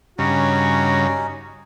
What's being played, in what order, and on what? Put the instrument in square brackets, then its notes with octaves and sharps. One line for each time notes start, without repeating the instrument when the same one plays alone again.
[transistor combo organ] G2 C#3 [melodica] C#4 D#4 [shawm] F#4